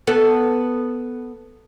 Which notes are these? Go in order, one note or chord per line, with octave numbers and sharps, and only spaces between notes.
B3 A4